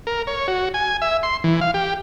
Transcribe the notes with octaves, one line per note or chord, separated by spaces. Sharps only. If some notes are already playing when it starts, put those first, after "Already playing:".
A#4
C#5
F#4
G#5
E5
C6
E3
F5
G4